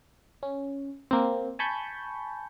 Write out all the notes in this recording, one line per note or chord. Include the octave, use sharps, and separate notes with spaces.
C#4
A#3 C4
G#5 A5 B5 C#6 G6